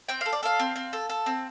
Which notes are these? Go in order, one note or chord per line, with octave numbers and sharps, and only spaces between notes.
C4 G5
A4 F5
D5
A4 F5
C4
C4
A4
A4
C4